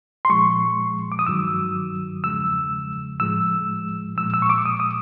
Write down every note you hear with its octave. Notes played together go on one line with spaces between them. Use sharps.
C6
A#2 F3 G#3 C#6
D6
D#6
G2 D#3 F#3 E6
E2 C#3 F3 G#3 E6
A2 F3 G#3 E6
A#2 F3 G#3 E6
E6
C#6
D6
D#6
D#6